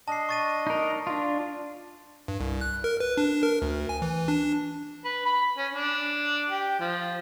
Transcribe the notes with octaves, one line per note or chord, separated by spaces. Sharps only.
D4 D#5 A5 C7
C#6 A6 D#7
D#4 A#4
D4 F4
G2
C2
F#6
A#4
B4
D4
A#4
D2
G#5
E3
D4
B4
B5
C#4
D4
G4
F3